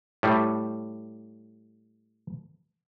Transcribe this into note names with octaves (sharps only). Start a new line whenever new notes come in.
A2 G3